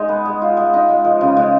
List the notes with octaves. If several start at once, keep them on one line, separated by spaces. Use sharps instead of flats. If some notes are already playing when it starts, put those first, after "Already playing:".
Already playing: G#3 D#4 G#4
B3
G#3
F4
G#3
D#4
G#3
F3
C#3
G#3